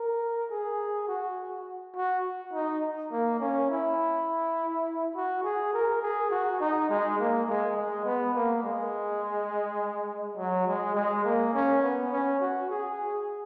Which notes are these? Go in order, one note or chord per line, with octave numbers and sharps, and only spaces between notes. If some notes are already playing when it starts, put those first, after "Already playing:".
Already playing: A#4
G#4
F#4
F#4
D#4
A#3
C#4
E4
F#4
G#4
A#4
G#4
F#4
D#4
G#3
A#3
G#3
G#3
B3
A#3
G#3
F#3
G#3
G#3
A#3
C#4
B3
C#4
F#4
G#4